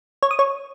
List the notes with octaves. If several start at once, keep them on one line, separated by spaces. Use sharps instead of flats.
C#5
D#6
C#5